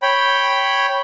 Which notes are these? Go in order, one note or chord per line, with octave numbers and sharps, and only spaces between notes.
C#5 G5 B5